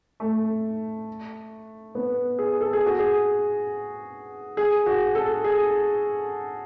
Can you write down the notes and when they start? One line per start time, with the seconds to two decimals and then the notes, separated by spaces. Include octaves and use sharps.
0.20 A3
1.95 B3
2.39 G#4
2.61 A4
2.73 G#4
2.86 F#4
2.99 G#4
4.57 G#4
4.86 F#4
5.15 A4
5.44 G#4